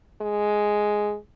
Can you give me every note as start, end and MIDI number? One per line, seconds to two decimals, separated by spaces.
0.22 1.16 56